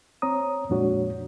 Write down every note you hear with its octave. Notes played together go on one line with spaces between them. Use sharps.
C4 C#5 A#5 D#6
F2 A#2 G#3 D4 F#4 C#5